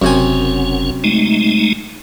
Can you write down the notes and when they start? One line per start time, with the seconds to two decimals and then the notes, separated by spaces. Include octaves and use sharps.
0.02 F#1 F#2 C3 C#4 G#5
1.04 G#3 A3 D#4